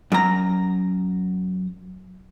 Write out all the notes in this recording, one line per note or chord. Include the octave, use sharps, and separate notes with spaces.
F#2 A#5